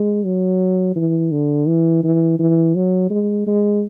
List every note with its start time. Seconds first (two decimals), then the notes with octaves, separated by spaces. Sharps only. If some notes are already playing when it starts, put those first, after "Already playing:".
Already playing: G#3
0.25 F#3
0.96 E3
1.32 D3
1.68 E3
2.04 E3
2.40 E3
2.75 F#3
3.10 G#3
3.47 G#3